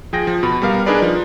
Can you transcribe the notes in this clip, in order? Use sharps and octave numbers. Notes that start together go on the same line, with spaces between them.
F3 G#4 G5 A#6
F3
B2 B5
G3 B3 A#4 F5
D4 D#4 G#4 A#4 B4 D5
F3